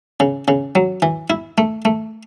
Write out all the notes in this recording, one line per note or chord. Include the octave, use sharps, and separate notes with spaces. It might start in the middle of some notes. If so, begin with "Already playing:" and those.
C#3
C#3
F#3
E3
E4
A3
A3